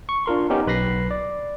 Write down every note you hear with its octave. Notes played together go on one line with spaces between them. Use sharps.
C#6
D4 F4 A#4 C6
B3 C#4 D#4 G4 A#4
B1 B4 B5 A#6 C7
D5